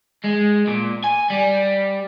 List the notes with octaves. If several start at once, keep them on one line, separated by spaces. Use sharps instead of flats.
G#3
A#2
G#5
G3